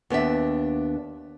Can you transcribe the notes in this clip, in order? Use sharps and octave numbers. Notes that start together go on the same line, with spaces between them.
D#2 B3 D4 E5